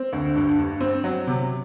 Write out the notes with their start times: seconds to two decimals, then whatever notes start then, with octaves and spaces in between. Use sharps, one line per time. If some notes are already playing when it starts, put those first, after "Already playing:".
Already playing: C4
0.13 D2
0.35 G2
0.58 G2
0.81 C4
1.04 F#3
1.27 C3